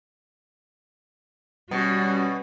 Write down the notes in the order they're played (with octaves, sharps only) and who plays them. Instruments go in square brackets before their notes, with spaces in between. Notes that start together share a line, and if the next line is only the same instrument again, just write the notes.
[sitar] B2 [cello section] G3 C#4 F#4